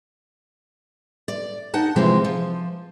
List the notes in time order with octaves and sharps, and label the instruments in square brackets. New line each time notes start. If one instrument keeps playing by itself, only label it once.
[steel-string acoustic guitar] D5
D#4 F#5 A5
C3 E3 F3 G#3 C4
F3